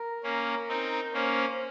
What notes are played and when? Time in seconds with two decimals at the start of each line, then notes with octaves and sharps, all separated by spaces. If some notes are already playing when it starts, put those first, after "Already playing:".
Already playing: A#4
0.23 A#3 C#4
0.68 C4 D#4
1.14 A#3 C#4 C5